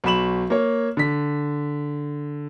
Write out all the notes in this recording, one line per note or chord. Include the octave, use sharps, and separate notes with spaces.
B1 F#4 B5 E7 F#7
A#3 C#5
D3 B6